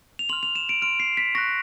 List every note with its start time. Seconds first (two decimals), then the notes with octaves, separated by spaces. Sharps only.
0.19 F7
0.29 C6 F6 F#7
0.43 F7
0.55 E7
0.69 D7
0.82 C6 F6 D7
1.00 C7
1.17 B6
1.35 C#6 F#6 A#6